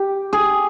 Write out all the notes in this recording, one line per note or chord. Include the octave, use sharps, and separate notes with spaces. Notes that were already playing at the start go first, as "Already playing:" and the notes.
Already playing: G4
G#4